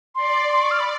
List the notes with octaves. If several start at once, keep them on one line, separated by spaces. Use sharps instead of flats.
D5 C6
C6
C#6
F6
B5